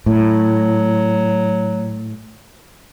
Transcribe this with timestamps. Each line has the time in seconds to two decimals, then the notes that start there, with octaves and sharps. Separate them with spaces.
0.06 A2 F#3